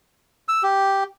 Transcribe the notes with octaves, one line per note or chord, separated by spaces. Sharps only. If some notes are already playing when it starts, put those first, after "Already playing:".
E6
G4